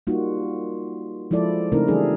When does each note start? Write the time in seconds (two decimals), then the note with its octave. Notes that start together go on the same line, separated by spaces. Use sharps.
0.07 G3 A#3 D#4 F4 F#4
1.31 F3 G#3 E4 A4 D5
1.72 C#3 A3 C4 D#4 E4 A#4
1.88 E3 G3 D4 G#4 A4